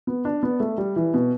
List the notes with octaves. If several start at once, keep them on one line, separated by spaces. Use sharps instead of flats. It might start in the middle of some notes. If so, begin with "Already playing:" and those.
B3
D4
B3
A3
G3
E3
B2